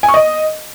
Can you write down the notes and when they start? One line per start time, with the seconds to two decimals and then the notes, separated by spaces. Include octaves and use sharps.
0.03 G#5
0.08 C#6
0.14 D#5